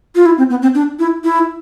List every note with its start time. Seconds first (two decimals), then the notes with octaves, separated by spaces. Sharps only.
0.15 F4
0.26 E4
0.38 C4
0.50 B3
0.62 C4
0.75 D4
0.99 E4
1.24 E4